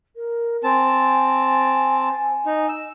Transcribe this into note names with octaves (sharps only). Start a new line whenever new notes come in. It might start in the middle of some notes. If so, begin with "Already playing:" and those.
A#4
C4 G#5 A5
D#4
E6